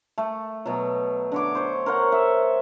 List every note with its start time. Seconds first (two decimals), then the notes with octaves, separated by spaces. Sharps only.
0.18 A3
0.65 B2 F#3
1.32 D3 C#5 D6
1.55 C5 C#5
1.86 A#4 C5 C#5 F#5
2.12 E5